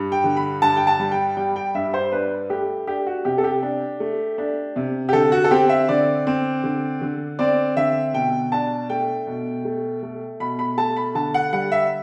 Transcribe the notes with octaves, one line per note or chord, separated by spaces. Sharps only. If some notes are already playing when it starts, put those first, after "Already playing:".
Already playing: G2
G5
D3
B5
G2 A5
G5
A5
G3
G5
G3 G5
G5
G2 E5
C5
D4 B4
A3 G4
D4 G4
F#4
C3 G4
A4
G4
D4
A3
D4
C3
G4
D3 A4
F#4
A4
C4 G4
E5
D3 D5
C4
D3
D3
C4 D5
D3 E5
B2 G5
D4 A5
A3 G5
B2
A3
A3
B2 B5
B5
A3 A5
B5
D3 A5
F#5
G3 F#5
E5